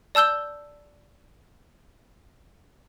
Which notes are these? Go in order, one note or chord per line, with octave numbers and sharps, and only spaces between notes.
D5 A5 E6 G6 G7